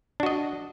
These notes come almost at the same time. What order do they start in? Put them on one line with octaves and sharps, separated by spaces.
D4 F#4 D#5